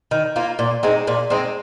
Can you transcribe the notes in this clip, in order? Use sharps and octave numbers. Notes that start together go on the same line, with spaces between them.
D#3
A#3 F4
A#2
G#3 C4 D#4
A#2
G#3 C4 D#4